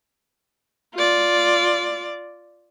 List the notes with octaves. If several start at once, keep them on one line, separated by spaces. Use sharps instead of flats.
F4 D5